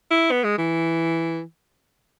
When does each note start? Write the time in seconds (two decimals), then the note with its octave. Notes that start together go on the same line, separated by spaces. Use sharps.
0.11 E4
0.32 B3
0.45 G#3
0.58 E3